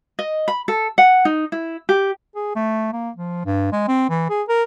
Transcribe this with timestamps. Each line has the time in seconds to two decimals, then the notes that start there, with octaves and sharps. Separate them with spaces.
0.19 D#5
0.48 B5
0.68 A4
0.98 F#5
1.25 D#4
1.52 E4
1.89 G4
2.36 G#4
2.56 A3
2.93 A#3
3.17 F3
3.46 G2
3.73 G#3
3.88 C4
4.09 E3
4.30 G#4
4.49 A#4